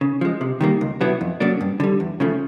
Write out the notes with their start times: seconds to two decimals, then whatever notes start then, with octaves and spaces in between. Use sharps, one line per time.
0.01 C#3
0.21 F3 G#3
0.41 C3
0.61 D#3 G3 A#3
0.81 C#2
1.01 B2 F#3 B3 E4
1.21 F2
1.40 C#3 F#3 A#3 D4
1.61 G2
1.80 D3 G3
2.00 E2
2.20 C#3 F3 A3